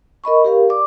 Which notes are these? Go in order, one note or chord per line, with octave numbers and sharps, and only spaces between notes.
A#4 D#5 B5 C#6
G4 A#4 F5
D5 D6